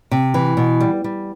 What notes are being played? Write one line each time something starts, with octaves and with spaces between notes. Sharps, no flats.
C3
E3
B2
G3
G3